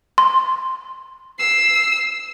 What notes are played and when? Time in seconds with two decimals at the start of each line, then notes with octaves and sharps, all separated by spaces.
0.18 C6
1.39 E6 C7